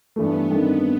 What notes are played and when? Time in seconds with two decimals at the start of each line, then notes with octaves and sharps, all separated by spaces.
0.16 G2 E3 A3 B3
0.50 G2 D#3 A3 C4